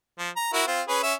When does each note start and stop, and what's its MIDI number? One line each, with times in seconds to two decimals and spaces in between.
0.19 0.29 53
0.36 0.52 82
0.53 0.63 64
0.53 0.63 66
0.53 0.63 70
0.67 0.82 60
0.67 0.82 65
0.88 1.01 61
0.88 1.01 68
0.88 1.01 71
1.03 1.14 61
1.03 1.14 76